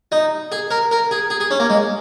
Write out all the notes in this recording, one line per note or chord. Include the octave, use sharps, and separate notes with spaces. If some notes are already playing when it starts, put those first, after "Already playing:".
D#4
G#4
A#4
A#4
G#4
G#4
G#4
C#4
A#3
G#3